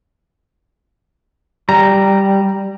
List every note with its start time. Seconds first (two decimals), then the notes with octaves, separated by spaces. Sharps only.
1.69 G3 A#5